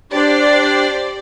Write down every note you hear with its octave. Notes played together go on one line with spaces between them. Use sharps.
D4 G4 C5 D5